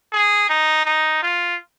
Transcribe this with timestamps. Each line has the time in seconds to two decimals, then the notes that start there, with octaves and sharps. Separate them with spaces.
0.12 G#4
0.49 D#4
0.85 D#4
1.23 F4